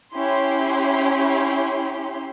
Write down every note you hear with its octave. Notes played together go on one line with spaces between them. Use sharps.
C#4 E4 G4 C6